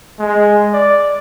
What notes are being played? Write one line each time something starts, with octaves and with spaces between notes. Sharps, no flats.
G#3
D5